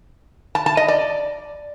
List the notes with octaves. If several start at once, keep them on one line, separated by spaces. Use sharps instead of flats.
A5
A5
D#5
D5